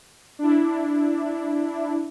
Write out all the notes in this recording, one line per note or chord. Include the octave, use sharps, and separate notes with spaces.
D4 E4